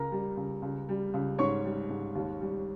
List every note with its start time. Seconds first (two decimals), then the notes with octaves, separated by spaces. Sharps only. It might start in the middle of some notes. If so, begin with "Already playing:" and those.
Already playing: C#2 A#4 A#5
0.12 G3
0.37 C#2
0.62 C#2
0.89 G3
1.14 C#2
1.38 G#2 C#5 C#6
1.65 G3
1.90 G#2
2.15 D#2
2.41 G3